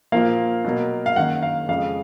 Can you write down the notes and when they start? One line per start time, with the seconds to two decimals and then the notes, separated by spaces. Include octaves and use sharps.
0.12 A#2 F3 A#3 F5
0.65 B2 F#3 A#3
1.06 F5
1.16 F#2 D#3 A#3 F#5
1.42 F5
1.69 F2 C#3 G#3 F5